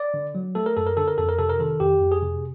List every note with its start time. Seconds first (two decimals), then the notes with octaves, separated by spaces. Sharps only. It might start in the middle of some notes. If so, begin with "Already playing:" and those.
Already playing: D5
0.14 D3
0.35 F#3
0.55 A3 A4
0.66 A#4
0.77 F#2 A4
0.86 A#4
0.97 D3 A4
1.08 A#4
1.18 F2 A4
1.29 A#4
1.39 C3 A4
1.49 A#4
1.59 D#3 A4
1.80 F2 G4
2.01 F2
2.12 G#4
2.23 C3